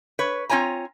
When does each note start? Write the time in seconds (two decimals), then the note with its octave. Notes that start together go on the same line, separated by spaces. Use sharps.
0.19 B4 C#5
0.49 C4 F4 C#5 G#5 A#5